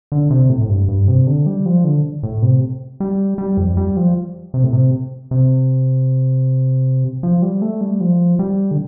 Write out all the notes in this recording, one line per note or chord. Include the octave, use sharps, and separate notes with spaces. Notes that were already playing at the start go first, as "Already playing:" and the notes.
D3
C3
A2
A2
G2
G2
C3
D3
G3
F3
D3
A2
C3
G3
G3
F2
G3
F3
C3
A2
C3
C3
F3
G3
A3
G3
F3
G3
D3